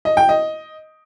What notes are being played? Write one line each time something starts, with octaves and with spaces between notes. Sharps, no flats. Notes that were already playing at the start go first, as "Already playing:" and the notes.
D#5
G5
D#5